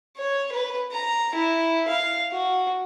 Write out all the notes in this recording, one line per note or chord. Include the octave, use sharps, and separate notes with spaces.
C#5
B4
A#5
E4
F5
F#4